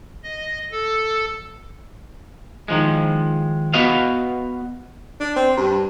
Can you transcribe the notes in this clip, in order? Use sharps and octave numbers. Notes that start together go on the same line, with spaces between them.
D#5
A4
D#3 F3 G#3
B3 F#4 B4 D#5 F5
D4
C4
G2